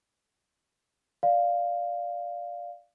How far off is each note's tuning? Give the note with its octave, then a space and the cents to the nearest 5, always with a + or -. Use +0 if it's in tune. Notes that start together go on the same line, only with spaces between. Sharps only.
D5 +0 F5 +0